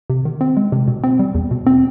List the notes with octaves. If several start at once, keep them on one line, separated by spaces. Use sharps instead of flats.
C3
D#3
C4
G#3
C3
B2
C4
G3
E2
B2
C4